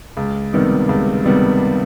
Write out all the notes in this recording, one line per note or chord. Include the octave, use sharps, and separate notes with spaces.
C#2
C3 D#3 G3 B3
C#2
C3 D#3 G3 B3